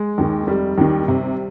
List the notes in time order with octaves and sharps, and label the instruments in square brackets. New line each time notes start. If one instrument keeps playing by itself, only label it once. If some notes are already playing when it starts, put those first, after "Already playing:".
Already playing: [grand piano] G#3
[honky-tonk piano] D#2 D#3
[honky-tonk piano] F1 [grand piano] G3
[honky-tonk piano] D#2 D#3
C3